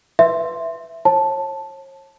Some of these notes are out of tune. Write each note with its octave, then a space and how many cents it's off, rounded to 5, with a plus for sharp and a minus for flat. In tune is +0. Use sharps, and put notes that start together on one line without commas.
B4 +0 E5 +10 C6 +0
C#5 -40 A5 +0